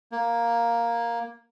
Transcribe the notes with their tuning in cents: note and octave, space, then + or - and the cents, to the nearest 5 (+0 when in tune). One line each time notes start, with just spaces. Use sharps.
A#3 +5